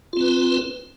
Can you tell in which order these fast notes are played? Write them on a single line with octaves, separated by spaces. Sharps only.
F4 C4 B4